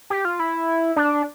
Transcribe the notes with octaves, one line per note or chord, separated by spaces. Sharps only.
G4
F4
E4
D4